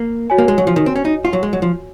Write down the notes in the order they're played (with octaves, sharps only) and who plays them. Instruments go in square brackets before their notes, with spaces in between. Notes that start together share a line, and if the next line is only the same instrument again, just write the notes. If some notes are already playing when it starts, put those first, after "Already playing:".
Already playing: [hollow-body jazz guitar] A#3
[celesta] F#4 C#5 G#5
[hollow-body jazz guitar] A#3
G#3
F#3
F3
D#3
C4
C#4
D#4
F4
F#3
G#3
F#3
F3